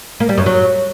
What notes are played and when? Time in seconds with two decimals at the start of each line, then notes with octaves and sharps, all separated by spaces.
0.20 A#3
0.29 G3
0.38 F#2
0.46 F#3